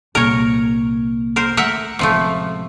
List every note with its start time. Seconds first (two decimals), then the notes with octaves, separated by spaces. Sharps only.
0.15 C2 A#2 A#4 C#5
1.36 A#4 C5
1.57 A3 A#4 E5 F#5
1.99 A1 C3 F3 G#3 A3